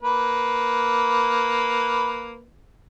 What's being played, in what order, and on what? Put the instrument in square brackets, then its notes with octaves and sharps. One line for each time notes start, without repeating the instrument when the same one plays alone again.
[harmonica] A#3 B4